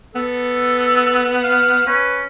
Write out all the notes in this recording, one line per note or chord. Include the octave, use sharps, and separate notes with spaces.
B3 A4
F5
C#4 B4